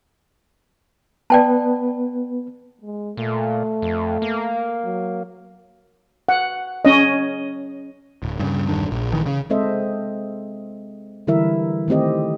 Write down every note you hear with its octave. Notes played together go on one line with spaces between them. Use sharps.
B3 B4 D5 G5 A5
G#3
A#2 A3
F2
A#3
F#3
F#5
C#4 D#5
D1
G2 C#3
E1 G2 D#3 D4
A#1
A1 D#3 E3
C#3
G#3 C4 A4 C5 D#5 E5
D3 E3 G3 E4 A#4 E5
D#3 A3 C4 G4 D#5